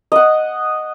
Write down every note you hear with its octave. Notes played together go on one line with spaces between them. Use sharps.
D#5 F#5